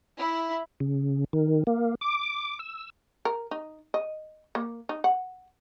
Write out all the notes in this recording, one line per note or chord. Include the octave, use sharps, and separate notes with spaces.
E4
C#3
D#3
A#3
D6
E6
A#4
D#4
D#5
A#3
D#4
F#5